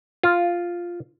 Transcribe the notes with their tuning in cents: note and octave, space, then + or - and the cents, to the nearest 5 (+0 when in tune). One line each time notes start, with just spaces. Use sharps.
F4 +0